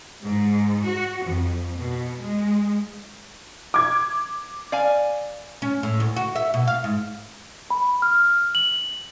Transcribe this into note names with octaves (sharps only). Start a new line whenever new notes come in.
G#2
F#4
F2
B2
G#3
D6 G#6
D5 F5 G#5
C#4
A2
D2
F#4
E5
B2
F5
G#2
B5
F6
F#7